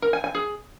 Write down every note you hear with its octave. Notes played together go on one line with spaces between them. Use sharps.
A#4
G#5
G#5
G#4